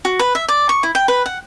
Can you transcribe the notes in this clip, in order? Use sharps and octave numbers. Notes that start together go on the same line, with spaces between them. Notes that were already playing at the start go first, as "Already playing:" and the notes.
F#4
B4
E5
D5
C#6
E4
G5
B4
F#5